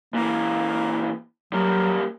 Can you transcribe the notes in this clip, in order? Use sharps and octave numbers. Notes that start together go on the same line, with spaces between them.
A#2 E3 A#3
F#3 G3 A#3